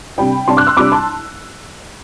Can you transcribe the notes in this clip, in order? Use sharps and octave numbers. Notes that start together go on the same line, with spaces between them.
C3 G3 D4 G5 B5
C3 G3 D4 A5 C6
D6 F#6
C6 E6
C3 G3 D4 B5 D6
A5 C6